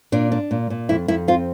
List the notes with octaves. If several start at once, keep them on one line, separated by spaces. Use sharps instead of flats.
A#2 D4
D4
A#2
A#2
F2 E4
F2 E4
C4 F4